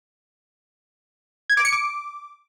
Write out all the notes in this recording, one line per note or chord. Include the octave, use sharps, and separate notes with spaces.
G#6
D6
C#7
D6